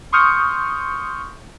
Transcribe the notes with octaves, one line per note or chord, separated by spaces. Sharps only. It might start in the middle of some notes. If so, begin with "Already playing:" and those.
C6 C#6 D#6 F6 G6 C#7